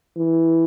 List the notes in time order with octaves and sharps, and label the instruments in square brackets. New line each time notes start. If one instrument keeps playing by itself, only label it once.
[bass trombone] E3